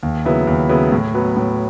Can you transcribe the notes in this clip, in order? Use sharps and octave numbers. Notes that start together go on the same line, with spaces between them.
D#2
C#3 F#3 B3 E4
D#2
C#3 F#3 B3 E4
A2
F#3 B3
A2